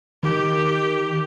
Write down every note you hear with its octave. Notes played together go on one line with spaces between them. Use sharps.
D#3 G4